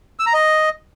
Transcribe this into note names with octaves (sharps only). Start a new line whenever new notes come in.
E6
A#5
D#5